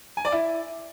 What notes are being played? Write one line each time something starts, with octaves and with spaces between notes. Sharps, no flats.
G#5
D5
E4